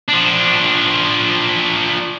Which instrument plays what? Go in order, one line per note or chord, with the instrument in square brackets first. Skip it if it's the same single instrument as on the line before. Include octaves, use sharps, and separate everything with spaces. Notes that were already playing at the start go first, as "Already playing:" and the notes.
[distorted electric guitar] F3 D4